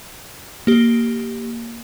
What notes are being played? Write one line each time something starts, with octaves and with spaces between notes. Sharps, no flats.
A#3 G4